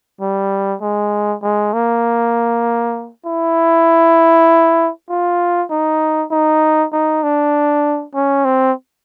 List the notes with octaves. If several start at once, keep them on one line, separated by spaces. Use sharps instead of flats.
G3
G#3
G#3
A#3
E4
F4
D#4
D#4
D#4
D4
C#4
C4